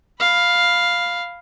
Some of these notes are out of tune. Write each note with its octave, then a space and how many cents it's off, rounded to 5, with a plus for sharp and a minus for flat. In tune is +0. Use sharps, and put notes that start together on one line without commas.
F5 +0 B5 +0